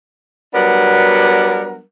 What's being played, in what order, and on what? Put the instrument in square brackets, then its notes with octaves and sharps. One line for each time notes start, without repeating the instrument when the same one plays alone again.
[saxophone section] F#3 G3 B3 D4 A#4 F#5